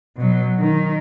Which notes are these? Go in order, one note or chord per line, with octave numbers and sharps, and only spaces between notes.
B2 F#3
D#3